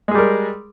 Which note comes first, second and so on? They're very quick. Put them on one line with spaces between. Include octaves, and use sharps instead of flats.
G#3 G#4 G3 A#4